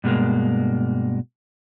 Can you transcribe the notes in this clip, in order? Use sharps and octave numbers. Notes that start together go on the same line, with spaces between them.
G2 B2 G3 G#3 A#3